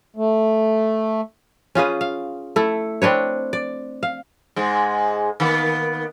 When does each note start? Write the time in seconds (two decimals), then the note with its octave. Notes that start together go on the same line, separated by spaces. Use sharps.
0.16 A3
1.75 C#4 F4 G#4 B4
2.01 F5
2.56 A3 E4 A4
3.02 C4 D4 B4 C#5
3.53 D5
4.03 F5
4.56 G#2 G#3
5.40 D#3 A#3 B3